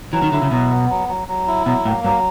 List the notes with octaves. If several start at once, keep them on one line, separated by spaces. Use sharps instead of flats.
E3 F#3
D#3
D3 E4
C#3
B2 F#3
B3
F#3
F#3
F#3
E4
B2 F#3
A2 A#3
G2 F#3